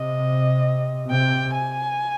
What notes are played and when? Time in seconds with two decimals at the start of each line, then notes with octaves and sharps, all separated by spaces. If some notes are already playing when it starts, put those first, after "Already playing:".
Already playing: C3 D#5
1.10 C3 G5
1.54 G#5